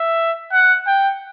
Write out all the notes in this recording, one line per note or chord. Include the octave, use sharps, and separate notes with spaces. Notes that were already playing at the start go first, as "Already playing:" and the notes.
Already playing: E5
F#5
G5